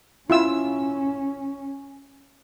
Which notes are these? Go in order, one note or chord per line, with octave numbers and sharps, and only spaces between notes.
C#4 E4 F4 E6